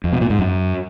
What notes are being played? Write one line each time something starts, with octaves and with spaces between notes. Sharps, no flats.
F2
B2
A#2
G#2
F#2